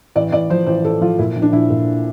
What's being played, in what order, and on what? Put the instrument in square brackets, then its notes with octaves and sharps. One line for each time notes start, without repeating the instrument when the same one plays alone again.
[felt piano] A1 D5
A1 D5
F3 C5
A1 C5
A1 A4
F3 F4
A#2 E4
A#1
D4
A#1 E4
A#2